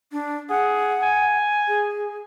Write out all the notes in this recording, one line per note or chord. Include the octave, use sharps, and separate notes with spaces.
D4
G#4 F#5
G#5
G#4